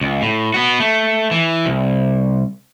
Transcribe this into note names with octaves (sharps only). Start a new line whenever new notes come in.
C#2
A2
B3 F#4
A3
E3
C2